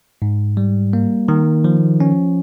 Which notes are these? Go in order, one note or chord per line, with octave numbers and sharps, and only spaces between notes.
G#2
G3
A#3
D#3
F3
C#4